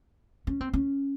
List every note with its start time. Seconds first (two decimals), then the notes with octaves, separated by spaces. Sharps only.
0.47 C#4
0.61 C4
0.73 C#4